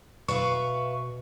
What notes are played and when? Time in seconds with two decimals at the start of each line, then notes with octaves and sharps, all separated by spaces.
0.28 B2 B4 E5 F5 C#6